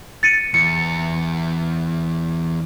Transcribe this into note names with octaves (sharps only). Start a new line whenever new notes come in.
A6 C#7 D#7
E2 C#7